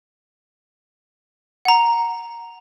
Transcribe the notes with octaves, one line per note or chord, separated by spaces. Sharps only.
F#5 A#5